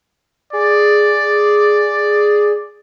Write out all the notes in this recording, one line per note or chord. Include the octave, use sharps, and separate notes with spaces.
G#4 D5